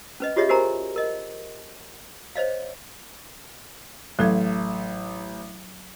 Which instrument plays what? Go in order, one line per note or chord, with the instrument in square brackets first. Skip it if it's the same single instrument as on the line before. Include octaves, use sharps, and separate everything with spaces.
[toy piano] C#4 B4 D#5
F4 G4 G#4 C#5 D#5 E5
F#4 G4 A#4 C5 G#5 A#5
A#4 D#5
C5 C#5 D#5 F5
[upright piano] A1 [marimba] F#3 A4 G#6